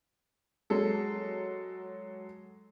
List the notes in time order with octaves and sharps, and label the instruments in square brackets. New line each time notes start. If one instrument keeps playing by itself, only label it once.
[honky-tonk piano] F#3 G#3 A4